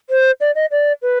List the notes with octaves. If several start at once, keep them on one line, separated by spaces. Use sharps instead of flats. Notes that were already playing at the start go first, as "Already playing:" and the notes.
C5
D5
D#5
D5
B4